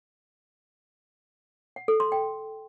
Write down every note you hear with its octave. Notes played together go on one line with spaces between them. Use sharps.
F#5
A4
C6
G5